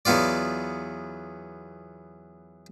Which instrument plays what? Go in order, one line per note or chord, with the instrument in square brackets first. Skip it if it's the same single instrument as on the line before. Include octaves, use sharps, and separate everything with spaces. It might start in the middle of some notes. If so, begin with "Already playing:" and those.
[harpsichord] E2 F#3 B3 F4 D5